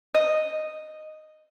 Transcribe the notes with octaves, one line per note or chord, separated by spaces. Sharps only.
D#5